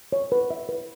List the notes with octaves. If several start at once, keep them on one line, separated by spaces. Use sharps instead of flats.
C#5
B4
E5
B4